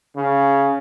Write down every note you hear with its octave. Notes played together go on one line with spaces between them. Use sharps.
C#3